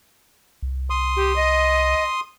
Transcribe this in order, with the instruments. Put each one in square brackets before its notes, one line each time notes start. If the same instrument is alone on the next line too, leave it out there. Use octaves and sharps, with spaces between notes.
[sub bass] C2
[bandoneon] C6 D#6
[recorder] G4
D#5